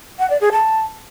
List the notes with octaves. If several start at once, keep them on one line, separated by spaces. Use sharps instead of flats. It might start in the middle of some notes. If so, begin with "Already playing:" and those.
F#5
D5
G#4
A5